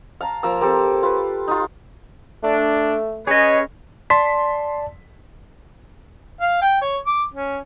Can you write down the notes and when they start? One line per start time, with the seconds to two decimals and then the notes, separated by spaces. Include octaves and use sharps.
0.21 F5 A5 A#5
0.43 F3 A#3 A#5 E6
0.61 A#3 C4 G4 A4
1.03 F4 B4
1.48 D#4 F4
2.43 A3 D4
3.27 C#4 G#4 B4 C#5 D#5
4.10 D5 A5 C6 B6
6.41 F5
6.61 G5
6.81 C#5
7.06 D6
7.34 C#4